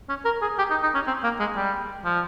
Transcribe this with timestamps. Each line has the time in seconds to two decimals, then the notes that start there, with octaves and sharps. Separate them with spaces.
0.09 C#4
0.25 A#4
0.42 G#4
0.58 G4
0.70 D#4
0.83 D#4
0.95 C#4
1.07 C4
1.24 A#3
1.40 G#3
1.56 G3
2.05 F3